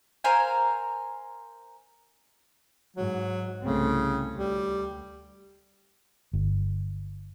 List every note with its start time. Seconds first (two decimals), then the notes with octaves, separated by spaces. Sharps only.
0.24 A#4 C5 F5 G#5
2.96 G#2 F#3
3.63 C2 C#3 A3 C4
4.36 D2 G3
6.33 G1